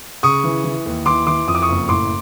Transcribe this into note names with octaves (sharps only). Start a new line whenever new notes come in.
C#3 C#6 D#6
E3
E3
D#2
E3 C6 D6
E3 C6 D6
F2 D#6
D6
C#6 D#6
F#1
A2 C6 D6